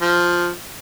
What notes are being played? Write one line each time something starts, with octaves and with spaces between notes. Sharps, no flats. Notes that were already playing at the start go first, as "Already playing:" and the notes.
F3